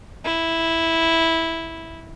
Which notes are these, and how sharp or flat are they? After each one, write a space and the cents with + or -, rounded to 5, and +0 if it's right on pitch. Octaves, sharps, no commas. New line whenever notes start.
E4 -5